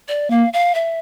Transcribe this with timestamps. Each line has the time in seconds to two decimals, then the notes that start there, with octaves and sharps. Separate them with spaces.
0.08 D5
0.31 A#3 F5
0.53 F5
0.75 E5